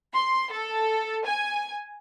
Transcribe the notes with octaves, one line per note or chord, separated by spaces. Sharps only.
C6
A4
G#5